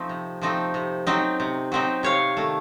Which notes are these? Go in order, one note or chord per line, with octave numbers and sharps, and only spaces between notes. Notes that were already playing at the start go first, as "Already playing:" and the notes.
Already playing: F3 A3 C4 D#4
C3
F3 A3 C4 D#4
C3
F#3 C4 D#4
C3
F#3 C4 D#4
C3 C#5 F5
D#3 A3